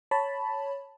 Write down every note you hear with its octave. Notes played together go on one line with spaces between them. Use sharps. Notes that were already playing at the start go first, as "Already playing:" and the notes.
C#5 A5 B5